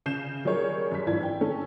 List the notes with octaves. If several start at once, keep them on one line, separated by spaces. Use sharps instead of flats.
C#3 G6 C7 E7
F#3 G3 G#4 A#4 C#5
F#2 B6
G#1 G2 E3 D4 E4 G#6
G5
D3 C#4 A4